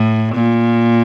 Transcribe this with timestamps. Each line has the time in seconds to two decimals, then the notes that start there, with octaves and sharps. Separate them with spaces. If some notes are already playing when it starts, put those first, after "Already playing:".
Already playing: A2
0.35 A#2